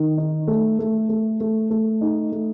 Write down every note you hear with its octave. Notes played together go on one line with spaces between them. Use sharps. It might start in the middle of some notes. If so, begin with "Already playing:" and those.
Already playing: D#3
D#4
A3
A3
A3
A3
A3
D#4
A3